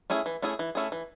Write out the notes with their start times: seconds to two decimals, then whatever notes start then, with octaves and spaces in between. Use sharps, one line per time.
0.10 A3 C#4 E4 G#4
0.26 E3
0.42 A3 C#4 E4 G#4
0.59 E3
0.75 A3 C#4 E4 G#4
0.92 E3